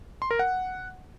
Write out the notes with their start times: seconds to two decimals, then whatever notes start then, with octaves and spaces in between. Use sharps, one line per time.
0.22 C6
0.31 A#4
0.39 F#5